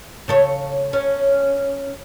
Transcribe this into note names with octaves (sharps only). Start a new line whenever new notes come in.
C#3 A4 C#5
C#4